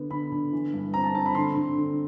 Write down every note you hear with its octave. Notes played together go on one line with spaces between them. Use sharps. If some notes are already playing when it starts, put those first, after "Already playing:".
Already playing: D3 B3
D3 B5
D3
E3
G2
C4 A#5
A5
C4 A5
B5
D3 C6
D3
D3